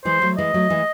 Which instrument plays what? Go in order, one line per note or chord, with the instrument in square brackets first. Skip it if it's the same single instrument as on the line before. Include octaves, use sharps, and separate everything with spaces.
[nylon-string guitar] E3 G#3 [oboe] C5
[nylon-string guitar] F#3 A3
[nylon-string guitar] E3 G#3 [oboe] D#5
[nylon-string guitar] F#3 A3
E3 G#3